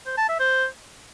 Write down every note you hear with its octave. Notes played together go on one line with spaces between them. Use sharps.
C5
A5
E5
C5